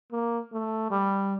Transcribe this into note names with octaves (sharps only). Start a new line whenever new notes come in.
A#3
A3
G3